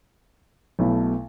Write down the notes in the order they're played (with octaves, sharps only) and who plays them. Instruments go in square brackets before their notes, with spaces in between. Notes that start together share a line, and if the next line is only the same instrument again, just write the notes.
[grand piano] B1 B2 A3 E4